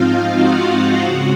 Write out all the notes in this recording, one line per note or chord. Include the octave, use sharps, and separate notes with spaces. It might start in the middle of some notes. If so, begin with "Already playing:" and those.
Already playing: G#2 F3 C4 D#4 F4 F5
F#4 F#5
C#3 G#3